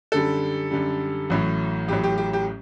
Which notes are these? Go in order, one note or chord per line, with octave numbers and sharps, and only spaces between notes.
F#2 D3 G3 A4
F#2 D3 G3
A1 A2 F#3
A1 A2 F#3 G4
G4
G4
G4